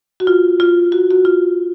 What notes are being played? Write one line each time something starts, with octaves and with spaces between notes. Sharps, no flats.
F#4
F4
F4
F#4
F#4
F4